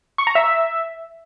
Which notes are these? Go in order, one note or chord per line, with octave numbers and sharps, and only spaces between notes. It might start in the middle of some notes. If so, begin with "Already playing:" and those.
C#6
A#5
E5